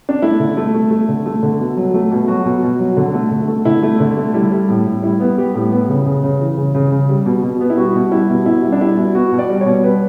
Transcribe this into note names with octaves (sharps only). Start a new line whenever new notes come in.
D4
A3 E4
D3
A3
A3
A3
D3
A3
D3
B2
F#3
A3
B2
F#3 F#4
B2
B2
F#3
D3
A3
D3
A3
D3 E4
A3
D3
A3
G3 E4
G3
A2
A2
G3 E4
B3
G3 G4
A2
B3
C#3
C#3
C#3
E3
C#3
C#3
C#3
G3
B2
B2
B3
E4
G3 F#4
B2
G3 E4
B2
B2 E4
G3
D4
G3 E4
B2
B3 F#4
B2
D5
G3
C#5
B2
G3 B4